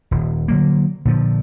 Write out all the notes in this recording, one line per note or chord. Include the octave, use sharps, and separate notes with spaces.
D#1
D3 F#3 A#3
A#2 D3 F3